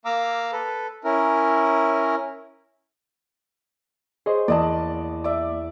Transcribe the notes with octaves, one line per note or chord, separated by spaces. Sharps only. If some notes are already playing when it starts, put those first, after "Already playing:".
A#3 F5 A#5 D6 E6
A4 B4
C#4 E4 A#4
G#4 C5 C#5 D#5 C6
E2 A#3 D5 D#5 A5
D5 E5